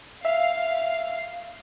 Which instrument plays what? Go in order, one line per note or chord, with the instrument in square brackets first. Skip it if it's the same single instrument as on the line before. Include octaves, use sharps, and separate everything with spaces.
[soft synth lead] E5 [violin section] F5